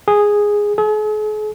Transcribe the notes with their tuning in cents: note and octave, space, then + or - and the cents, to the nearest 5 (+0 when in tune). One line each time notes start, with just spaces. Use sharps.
G#4 -5
G#4 +45